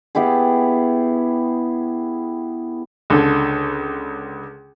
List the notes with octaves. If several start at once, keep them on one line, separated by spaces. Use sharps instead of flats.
B3 E4 G4 G#4
C#2 D3 A4